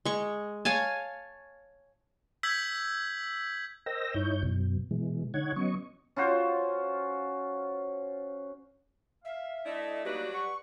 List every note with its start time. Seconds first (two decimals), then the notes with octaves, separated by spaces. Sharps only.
0.05 G#3 C#6
0.65 C#5 F5 G#5 A5
2.43 E6 G6 G#6 B6 F#7
3.86 A#4 C5 D#5 G5 E6 A#6
4.14 G2 D#4 E4 C#5 G6
4.43 F#2 B2
4.91 B2 E3 G#3
5.34 D3 D#4 C#5 F#5 G#6
5.56 F#3 B3 C#4 D#5 C#6
6.16 C#4 F4 F#4 C5
9.24 E5 F5
9.66 A3 D4 E4 D#5
10.05 F#3 G3 A3 A#3 D4 D#4 F#4 B4
10.33 F#5 C#6